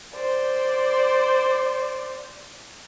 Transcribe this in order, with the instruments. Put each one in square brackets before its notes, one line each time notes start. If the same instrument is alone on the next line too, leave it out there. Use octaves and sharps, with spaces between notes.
[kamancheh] C5 D5